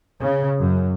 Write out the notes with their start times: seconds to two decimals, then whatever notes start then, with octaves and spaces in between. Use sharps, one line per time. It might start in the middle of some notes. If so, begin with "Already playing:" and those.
0.20 C#3
0.59 F#2